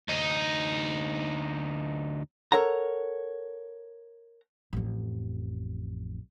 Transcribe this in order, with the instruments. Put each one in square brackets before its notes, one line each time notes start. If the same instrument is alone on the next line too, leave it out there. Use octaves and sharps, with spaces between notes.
[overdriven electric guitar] D2 D#4
[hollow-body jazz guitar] A4 A#4 C#5 F#5 A#5
[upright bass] A1 F2